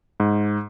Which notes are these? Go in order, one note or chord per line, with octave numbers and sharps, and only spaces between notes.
G#2